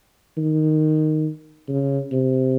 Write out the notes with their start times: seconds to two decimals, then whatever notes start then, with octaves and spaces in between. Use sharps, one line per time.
0.37 D#3
1.68 C#3
2.12 C3